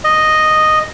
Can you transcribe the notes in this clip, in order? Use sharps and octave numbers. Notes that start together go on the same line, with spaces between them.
D#5